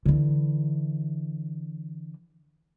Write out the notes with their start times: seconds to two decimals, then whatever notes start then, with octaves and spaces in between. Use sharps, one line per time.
0.06 D3 E3